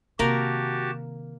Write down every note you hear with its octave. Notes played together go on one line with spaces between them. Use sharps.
C3 D#3 A#3 F#4 G4 A#4 A5